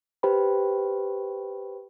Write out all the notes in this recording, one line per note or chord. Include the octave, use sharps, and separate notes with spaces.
G4 B4 C5 G5 B5